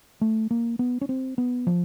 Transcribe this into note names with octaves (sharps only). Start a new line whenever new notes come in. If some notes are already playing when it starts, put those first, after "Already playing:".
A3
A#3
B3
C#4
C4
B3
F3